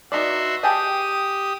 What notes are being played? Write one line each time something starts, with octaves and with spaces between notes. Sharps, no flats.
B3 D#4 F#4 D5 E5 C6
G4 G#4 G5 A5 D#6